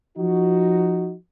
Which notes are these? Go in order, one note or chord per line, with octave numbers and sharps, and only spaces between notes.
F3 D#4 F#4